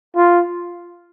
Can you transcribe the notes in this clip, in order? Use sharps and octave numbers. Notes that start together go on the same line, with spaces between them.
F4